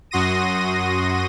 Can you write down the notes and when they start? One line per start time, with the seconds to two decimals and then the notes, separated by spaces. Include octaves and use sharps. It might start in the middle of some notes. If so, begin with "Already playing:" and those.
0.11 F#2 F#4 C6 D#6 A#6 D#7